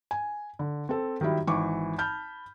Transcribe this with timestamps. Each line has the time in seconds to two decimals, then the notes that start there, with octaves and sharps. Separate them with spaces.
0.11 G#5
0.59 D3
0.89 C4 A4
1.21 D#3 F#3 G3 E4
1.47 G#1 E3 C#6 D6
1.98 A5 B5 F6 G6